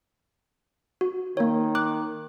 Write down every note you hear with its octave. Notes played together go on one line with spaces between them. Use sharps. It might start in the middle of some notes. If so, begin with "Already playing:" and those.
F#4
D#3 A#3 C#5
D6 F#6